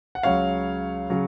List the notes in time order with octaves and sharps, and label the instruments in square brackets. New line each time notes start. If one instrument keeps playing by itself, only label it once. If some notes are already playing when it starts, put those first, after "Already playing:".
[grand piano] F#5
C#2 C#3 F#3 C#5 F5
C#3 F#3